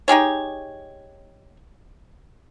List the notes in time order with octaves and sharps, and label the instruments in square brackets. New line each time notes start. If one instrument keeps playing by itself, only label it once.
[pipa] D#4 G4 G#4 C#5